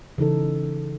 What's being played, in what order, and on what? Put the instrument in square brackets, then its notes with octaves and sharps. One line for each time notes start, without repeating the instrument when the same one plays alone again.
[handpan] C#3 E3 D#4 A4